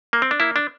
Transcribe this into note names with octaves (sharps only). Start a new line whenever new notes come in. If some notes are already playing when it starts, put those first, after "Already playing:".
A#3
C4
D4
A#3 E4
D4